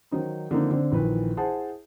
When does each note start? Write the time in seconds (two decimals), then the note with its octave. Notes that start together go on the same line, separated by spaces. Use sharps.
0.11 D#3 F#3 D#4 C5
0.51 D3 D#3 F3 A#3 C4 D#4
0.71 D3 C4 D4
0.92 A#1 D#3 E3 B4
1.37 E4 G#4 C5 F#5 A5